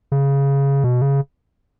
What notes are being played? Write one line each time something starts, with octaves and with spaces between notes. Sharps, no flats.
C#3
B2
C#3